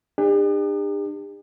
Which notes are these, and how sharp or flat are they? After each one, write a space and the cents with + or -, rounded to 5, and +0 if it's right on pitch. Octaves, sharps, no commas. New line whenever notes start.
D4 +35 G4 +45